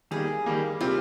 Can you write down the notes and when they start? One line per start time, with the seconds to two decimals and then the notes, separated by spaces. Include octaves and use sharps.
0.11 D#3 G3 A#3 G#4
0.46 D#3 G3 A#3
0.81 C3 G3 C4 F4